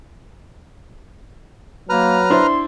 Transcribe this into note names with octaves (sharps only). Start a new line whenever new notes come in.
F#3 A#3 B4 A#5 F6
D4 E4 C5 C6